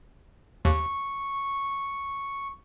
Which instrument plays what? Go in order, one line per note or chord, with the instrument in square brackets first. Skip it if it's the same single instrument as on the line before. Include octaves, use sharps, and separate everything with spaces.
[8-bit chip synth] D#2 [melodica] C#6